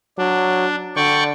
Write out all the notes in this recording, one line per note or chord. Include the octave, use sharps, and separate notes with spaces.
F#3 D4
D3 D5 G5 C#6